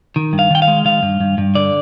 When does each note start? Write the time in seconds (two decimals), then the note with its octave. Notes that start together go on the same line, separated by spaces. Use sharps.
0.16 D#3
0.33 G2
0.39 F5
0.51 D#3 G5
0.62 F5
0.67 G#3
0.85 D#3 F5
1.03 G2
1.20 G2
1.38 G2
1.55 D3 D5